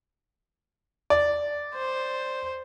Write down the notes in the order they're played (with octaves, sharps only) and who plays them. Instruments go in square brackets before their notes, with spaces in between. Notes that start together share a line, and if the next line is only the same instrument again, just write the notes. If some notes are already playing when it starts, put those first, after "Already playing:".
[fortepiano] D5
[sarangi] C5